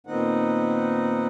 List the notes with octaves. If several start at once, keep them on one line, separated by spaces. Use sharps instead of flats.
A#2 D#3 B3 C4 D#4 F#5